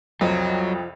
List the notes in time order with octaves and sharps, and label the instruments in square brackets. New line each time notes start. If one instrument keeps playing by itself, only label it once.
[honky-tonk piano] C2 F2 D#5 [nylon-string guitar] F3 [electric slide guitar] F#3